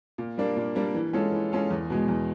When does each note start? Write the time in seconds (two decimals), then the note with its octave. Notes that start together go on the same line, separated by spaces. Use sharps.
0.18 A#2
0.38 G3 A#3 D4
0.56 A#2
0.75 G3 A#3 D4
0.94 E3
1.13 G#3 C#4 F4 A4
1.32 E3
1.52 G#3 C#4 F4 A4
1.70 E2
1.90 B2 G#3
2.08 E2